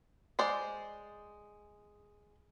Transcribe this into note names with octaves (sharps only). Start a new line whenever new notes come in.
G#3 C5 D5